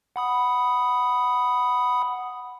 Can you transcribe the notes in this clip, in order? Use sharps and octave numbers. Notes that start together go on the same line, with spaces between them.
F#5 B5 D#6